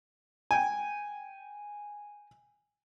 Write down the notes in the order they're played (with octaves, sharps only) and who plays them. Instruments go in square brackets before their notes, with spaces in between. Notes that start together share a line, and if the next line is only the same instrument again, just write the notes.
[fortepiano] G5 G#5